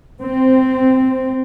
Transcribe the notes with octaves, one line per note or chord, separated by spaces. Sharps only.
C4